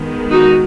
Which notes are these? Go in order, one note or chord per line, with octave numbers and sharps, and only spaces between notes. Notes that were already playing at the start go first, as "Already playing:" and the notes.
Already playing: D#3 G#3 B3
D#4 F#4